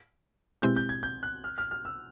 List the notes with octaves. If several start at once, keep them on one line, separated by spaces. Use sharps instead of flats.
B2 G#3 C4 E4 G4 G6
G6
G#6
G6
F#6
F6
F6
F6
E6